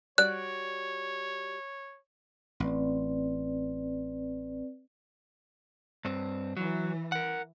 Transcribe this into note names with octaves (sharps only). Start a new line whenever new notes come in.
G3 F#4 C#5 D5 F#6
A1 C4 B4 D5
G2 C4
E3 F#3
A#4 F#5